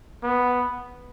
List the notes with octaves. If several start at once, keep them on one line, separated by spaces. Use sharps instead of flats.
B3